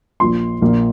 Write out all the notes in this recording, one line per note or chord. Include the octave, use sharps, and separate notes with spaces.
A#1 A#2 F3 A#3 C6
A#1 A#2 A#3